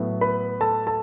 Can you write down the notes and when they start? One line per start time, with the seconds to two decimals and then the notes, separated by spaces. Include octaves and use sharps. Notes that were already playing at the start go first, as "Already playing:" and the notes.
Already playing: A2 F#3 B3
0.21 B4 B5
0.61 A4 A5
0.87 A4 A5